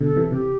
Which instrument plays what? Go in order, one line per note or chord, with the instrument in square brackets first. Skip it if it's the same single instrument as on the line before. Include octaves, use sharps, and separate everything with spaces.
[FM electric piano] B2 D3 [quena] A4
[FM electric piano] C3 E3
[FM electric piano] C3 [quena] G4